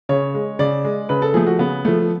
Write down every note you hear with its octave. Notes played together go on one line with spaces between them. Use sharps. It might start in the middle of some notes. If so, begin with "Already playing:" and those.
C#3 C#5
G#3
C#3 D5
G#3
C#3 B4
A4
F3 A3 G#4
F#4
C#3 B3
F3 A3